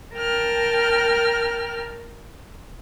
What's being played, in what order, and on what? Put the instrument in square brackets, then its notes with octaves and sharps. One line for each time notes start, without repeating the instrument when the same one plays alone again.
[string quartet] A#4 G5 A5 F6